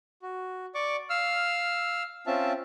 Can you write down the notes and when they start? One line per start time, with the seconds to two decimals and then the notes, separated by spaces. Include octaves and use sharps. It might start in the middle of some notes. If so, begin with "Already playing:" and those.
0.22 F#4
0.75 D5 C#6 D6
1.10 F5 E6 F6
2.27 C4 C#4 F4 E5 A5